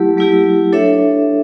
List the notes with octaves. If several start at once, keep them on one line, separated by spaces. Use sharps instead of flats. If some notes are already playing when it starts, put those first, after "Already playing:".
Already playing: F#3 A3 E4 G4
F#3 A3 E4 G4
D4 A4 C#5 E5